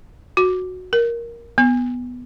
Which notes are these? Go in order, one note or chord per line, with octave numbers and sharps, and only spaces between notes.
F#4
A#4
B3